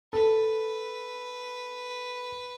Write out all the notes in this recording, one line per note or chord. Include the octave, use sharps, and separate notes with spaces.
A4 B4